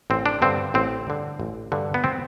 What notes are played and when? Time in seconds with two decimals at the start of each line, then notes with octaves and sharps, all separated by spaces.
0.10 A1 C4
0.26 D4
0.42 G2 D3 C4
0.74 A1 C4
1.07 G2 D3
1.40 A1
1.72 G2 D3
1.94 B3
2.04 C4